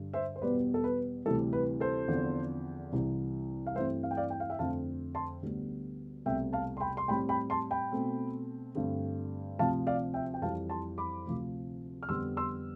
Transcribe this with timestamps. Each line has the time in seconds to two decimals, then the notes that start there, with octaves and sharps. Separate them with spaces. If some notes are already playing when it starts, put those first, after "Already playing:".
Already playing: G2 D3 G3
0.13 C5 E5
0.36 C5
0.42 E2 B2 G3 B3 B4 D5
0.74 A4
0.84 B4
1.26 D2 C3 E3 G3 A4
1.53 B4
1.80 A4 C5
2.08 E2 D3 F3 C4
2.92 C2 C3 E3
3.67 F5
3.75 G2 E3 A3 C4 C5 E5
4.03 F5
4.11 G5
4.17 D5 F5
4.30 G5
4.40 F5
4.50 E5 G5
4.59 F2 D3 A3 C4 F5 A5
5.15 A5 C6
5.42 D2 D3 G3 B3
6.26 C2 B2 A3 C4 E5 G5
6.53 F5 A5
6.77 C6
6.80 G5 B5
6.97 C6
7.08 A2 G3 C4 G5 B5
7.29 G5 B5
7.50 A5 C6
7.71 G5 B5
7.92 B2 A3 C4
8.75 G2 D3 A3 C4
9.59 D2 C3 F3 C4 F5 A5
9.87 D5 F5
10.14 E5 G5
10.34 G5
10.42 F2 E3 G3 F5 A5
10.70 A5 C6
10.98 B5 D6
11.26 D2 C3 F3
12.03 F6
12.09 F2 D3 G3 B3 C6 E6
12.37 C6 E6